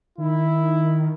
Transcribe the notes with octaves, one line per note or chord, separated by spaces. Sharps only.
D#3 E4